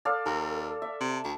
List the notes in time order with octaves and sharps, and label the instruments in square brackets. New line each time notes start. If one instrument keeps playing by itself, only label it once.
[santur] A4 D5 F5
[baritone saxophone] D#2 [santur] A4
[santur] E5
[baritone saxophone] C3
D2